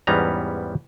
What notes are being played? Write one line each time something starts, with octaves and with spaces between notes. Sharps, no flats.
E2 G#2 G3 B3 C#4 A#5